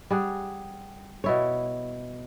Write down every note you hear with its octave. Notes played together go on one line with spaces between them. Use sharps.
G3 G#4 F#5
B2 E4 C#5